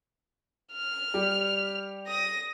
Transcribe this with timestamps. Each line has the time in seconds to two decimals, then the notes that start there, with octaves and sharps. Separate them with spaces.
0.72 F6
1.14 G3 G4
2.07 D#6 A#6